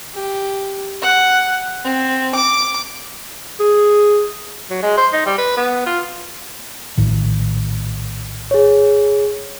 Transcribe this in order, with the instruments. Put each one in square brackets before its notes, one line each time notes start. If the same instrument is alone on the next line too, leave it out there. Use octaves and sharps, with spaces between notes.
[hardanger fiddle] G4
F#5
C4
D6
[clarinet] G#4
[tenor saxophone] F#3
G#3
C5
D#4
G3
B4
B3
F4
[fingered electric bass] A#1 A2 D#3
[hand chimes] G#4 C#5